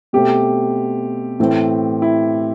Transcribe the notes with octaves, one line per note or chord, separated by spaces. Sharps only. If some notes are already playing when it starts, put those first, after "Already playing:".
B2 A3 C4 G4
A2 E3 A3 C4
E4